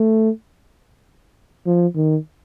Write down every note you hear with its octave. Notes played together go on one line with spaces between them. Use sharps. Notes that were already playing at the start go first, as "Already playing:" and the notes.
Already playing: A3
F3
D#3